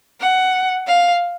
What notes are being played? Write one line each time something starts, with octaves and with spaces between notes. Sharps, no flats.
F#5
F5